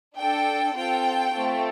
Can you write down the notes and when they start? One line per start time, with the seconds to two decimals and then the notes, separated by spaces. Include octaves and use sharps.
0.17 D4 A4 G5
0.76 C4 F4 A4 G5
1.34 A3 C4 F4 A4